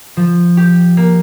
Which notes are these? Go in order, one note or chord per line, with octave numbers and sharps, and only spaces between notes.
F3
G4
A#3